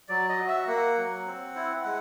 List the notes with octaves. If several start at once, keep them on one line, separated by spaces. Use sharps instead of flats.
F#3 D5
D#5
F#4
E5
A#3 F#5
F#3
C4
E4
G#3 F#5